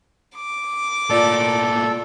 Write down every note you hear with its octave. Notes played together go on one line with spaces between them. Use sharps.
D6
A2 A#3 F4 A4 D5 A5